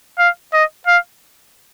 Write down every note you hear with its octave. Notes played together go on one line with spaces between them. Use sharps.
F5
D#5
F5